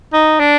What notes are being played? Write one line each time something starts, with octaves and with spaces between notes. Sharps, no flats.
D#4
D4